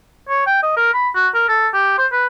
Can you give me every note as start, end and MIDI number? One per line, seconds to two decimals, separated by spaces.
0.29 0.44 73
0.46 0.59 79
0.63 0.75 75
0.76 0.92 70
0.94 1.09 83
1.15 1.28 66
1.34 1.48 70
1.48 1.68 69
1.73 1.94 67
1.98 2.07 72
2.12 2.27 71